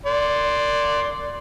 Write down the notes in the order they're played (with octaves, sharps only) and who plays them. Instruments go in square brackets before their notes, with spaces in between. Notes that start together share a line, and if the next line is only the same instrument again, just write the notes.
[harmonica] D5 C6